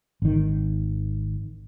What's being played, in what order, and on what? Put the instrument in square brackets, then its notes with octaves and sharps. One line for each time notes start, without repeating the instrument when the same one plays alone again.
[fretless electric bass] G#1 D#3